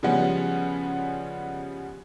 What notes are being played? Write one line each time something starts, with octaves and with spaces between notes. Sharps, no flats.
C#3 F3 G3 G#3 B3 C#4